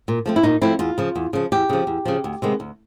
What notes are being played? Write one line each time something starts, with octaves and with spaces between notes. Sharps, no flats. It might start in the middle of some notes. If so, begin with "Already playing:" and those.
A#2
F3 A3 C4
E4
A#2 D#4
F3 A3 C4 E4
E2 F4
C#3 F3
E2
C#3 F3
E2 G4
C#3 F3
E2
C#3 F3
D2
C3 D#3 G#3 B3
D2